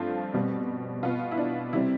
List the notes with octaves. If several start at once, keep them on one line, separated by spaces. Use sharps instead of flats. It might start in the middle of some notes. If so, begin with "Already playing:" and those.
Already playing: G2 F3 A3 C4 F4
B2 G3 C4
B2 B3 F4
E4
D4
C3 G3 C4 E4